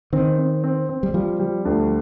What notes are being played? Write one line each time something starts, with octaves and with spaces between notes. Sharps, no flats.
D#3 C4
C4
C4
C4
G3
F3 G3
G3
D2